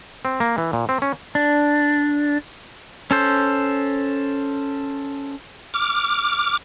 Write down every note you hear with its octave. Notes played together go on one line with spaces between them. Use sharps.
C4
A#3
E3
A#2
C4
C#4
D4
C#4 A4 C5
D6 F6